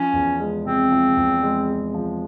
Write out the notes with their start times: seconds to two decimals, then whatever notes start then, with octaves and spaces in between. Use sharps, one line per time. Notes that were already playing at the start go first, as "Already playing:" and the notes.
Already playing: F3 C#4
0.13 E2
0.39 G#3
0.65 C3 C4
0.91 F3
1.17 E2
1.43 G#3
1.68 C3
1.94 F3